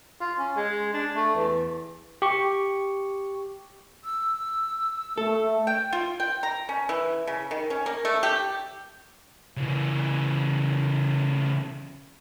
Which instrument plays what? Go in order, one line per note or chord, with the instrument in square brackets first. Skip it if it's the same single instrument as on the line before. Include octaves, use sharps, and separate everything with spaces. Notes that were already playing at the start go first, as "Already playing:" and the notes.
[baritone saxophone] F4
C#4
G#3
D4
A3
E2
[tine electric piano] G4 C#6
[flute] E6
[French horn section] A3 [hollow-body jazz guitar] A4
[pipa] G5
F4
G5
A#5
C#4
E3
C#3
D#3
C#4
A#3
A3
G4
[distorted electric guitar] C#3 E3